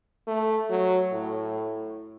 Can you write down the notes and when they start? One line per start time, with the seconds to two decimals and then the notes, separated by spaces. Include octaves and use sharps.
0.27 A3
0.70 F#3
1.12 A2